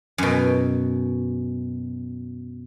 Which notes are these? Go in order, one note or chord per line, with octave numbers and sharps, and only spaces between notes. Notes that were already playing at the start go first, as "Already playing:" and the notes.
F#2 B2